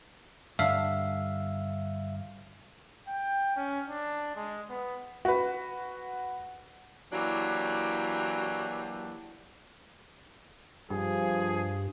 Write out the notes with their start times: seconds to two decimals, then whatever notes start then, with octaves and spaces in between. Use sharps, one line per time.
0.59 G2 D3 E5 F5
3.08 G5
3.56 C#4
3.88 D4
4.36 G#3
4.69 B3
5.25 F#4 B4
7.13 E3 F#3 A#3 D4 F#4 G4
10.90 G2 F3 G#4